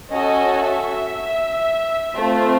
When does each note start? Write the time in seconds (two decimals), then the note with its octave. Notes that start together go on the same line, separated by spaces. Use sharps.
0.12 C#4 F#4 A4 D#5
0.64 E5
2.17 A3 C4 F4